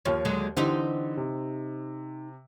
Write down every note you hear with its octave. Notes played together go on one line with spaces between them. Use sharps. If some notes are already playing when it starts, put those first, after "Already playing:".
D#2 F3 C#5
D3 F#3 G#3
D3 E3 C4 D#4 G4
C3